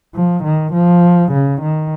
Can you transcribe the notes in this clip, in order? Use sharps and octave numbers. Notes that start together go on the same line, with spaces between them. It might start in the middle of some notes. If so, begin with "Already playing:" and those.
F3
D#3
F3
C#3
D#3